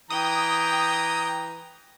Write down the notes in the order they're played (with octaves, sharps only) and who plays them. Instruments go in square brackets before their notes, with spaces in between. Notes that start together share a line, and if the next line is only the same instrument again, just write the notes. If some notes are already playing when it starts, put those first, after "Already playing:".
[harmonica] E3 A#5 [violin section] G5 [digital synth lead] D#6